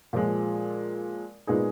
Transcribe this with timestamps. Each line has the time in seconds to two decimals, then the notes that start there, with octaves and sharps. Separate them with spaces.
0.13 A#2 F3 G#3
1.47 A#2 G#3 B3 D#4 G#4